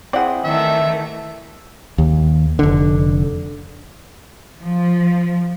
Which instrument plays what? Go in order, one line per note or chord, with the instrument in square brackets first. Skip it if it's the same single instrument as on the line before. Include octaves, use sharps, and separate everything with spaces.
[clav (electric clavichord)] C4 E4 G#4 [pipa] D5 F#5
[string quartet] D#3 E3 A3 [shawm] E5
[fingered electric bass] D#2
F1 D3
[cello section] F3